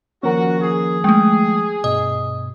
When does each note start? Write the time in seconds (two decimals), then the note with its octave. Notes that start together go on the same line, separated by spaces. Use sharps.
0.23 D#3 F3 A#3 C#4 F#4 A#4
0.61 G#4
1.04 G#3 A3 G5 D#6
1.84 G2 B2 D#5 D#6